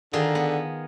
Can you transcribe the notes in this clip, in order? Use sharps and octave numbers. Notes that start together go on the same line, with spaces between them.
D3 D#3 F4 G#4
B3